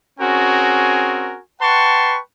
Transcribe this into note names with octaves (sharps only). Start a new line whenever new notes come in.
C4 C#4 F#4 G#4 A#4 G#5
B4 F#5 G5 A5 C6 C#6